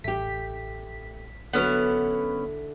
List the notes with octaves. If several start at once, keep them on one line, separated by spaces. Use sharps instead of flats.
A1 A3 G4 B6
D3 F#3 B3 C#4 E4 B4